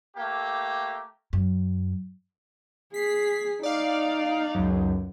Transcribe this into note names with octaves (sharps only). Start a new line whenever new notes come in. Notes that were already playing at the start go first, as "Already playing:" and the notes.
A3 A#3 G4
F#2
G#4 B6 C7
D#4 D5 F5
C#2 F#2